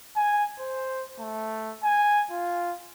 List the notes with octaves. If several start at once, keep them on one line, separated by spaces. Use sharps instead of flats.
G#5
C5
A3
G#5
F4